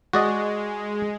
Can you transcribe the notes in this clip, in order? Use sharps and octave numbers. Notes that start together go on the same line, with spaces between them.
G#3 F#4 D5 D#5